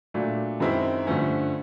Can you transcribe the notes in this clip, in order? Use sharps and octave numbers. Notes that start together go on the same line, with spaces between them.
A#2 F#3 A3 D4
F#2 D#3 G#3 C4 E4
G2 D3 F3 A3 C#4